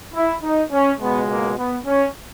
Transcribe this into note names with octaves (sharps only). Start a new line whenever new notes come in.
E4
D#4
C#4
C#2 B2 G#3 B3
A#3
B3
C#4